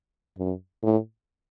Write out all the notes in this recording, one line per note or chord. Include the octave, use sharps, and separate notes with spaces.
F#2
A2